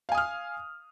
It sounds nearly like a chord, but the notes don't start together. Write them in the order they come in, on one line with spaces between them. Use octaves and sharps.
F5 G#5 D#6 F6